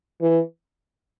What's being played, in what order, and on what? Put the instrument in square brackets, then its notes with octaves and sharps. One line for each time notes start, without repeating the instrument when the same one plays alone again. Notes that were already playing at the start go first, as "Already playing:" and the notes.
[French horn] E3